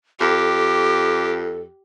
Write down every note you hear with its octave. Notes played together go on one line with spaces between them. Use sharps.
F2 G4 A4 D6